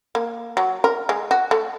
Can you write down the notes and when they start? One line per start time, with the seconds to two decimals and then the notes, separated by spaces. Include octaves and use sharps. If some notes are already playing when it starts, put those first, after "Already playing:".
0.15 A#3
0.57 F#3
0.84 A#4
1.09 G#3
1.31 F#4
1.51 A3